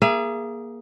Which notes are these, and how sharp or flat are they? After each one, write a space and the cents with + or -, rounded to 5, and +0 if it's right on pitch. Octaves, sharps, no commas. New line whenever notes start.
A#3 +20 G#4 +0 E5 +45